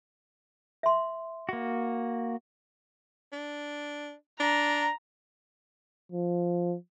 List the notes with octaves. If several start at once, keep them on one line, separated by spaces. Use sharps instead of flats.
E5 C6
A#3 F#4
D4
D4 A#5
F3